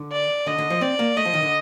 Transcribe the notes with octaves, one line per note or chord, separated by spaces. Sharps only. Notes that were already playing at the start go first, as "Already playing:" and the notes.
Already playing: D3
D5
D3 D#5
D3
F3
C4 D5
A#3
A3 D#5
F3
D#3
D3